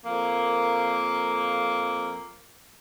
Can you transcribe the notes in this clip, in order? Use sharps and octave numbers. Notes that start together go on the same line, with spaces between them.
F2 A#3